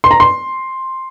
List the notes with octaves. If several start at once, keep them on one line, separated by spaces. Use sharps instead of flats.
C6
A#5
C6